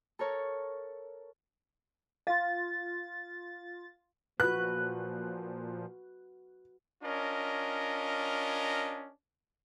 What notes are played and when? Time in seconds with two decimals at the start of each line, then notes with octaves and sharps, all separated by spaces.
0.19 A4 A#4 C#5
2.27 F4 F5 A6
4.40 A#2 F3 F#4 B4 F#6
7.03 C#4 D4 F4 A#4 C#5 D#5